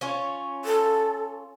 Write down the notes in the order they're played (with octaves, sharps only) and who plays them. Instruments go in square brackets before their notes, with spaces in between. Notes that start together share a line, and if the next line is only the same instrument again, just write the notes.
[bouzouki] C#4 F4 C#5
[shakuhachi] A4